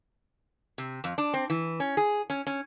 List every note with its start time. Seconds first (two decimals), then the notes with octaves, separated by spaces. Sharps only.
0.78 C3
1.04 F2
1.18 D4
1.34 C4
1.50 E3
1.80 C#4
1.97 G#4
2.30 C#4
2.47 C#4